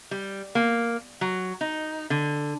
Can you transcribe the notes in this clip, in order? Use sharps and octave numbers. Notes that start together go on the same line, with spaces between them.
G3
A#3
F#3
D#4
D3